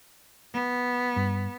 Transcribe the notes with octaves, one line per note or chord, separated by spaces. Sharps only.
B3
G2